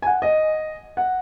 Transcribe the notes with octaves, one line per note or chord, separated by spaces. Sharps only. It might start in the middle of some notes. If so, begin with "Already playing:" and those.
G#5
F#5
D#5
F#5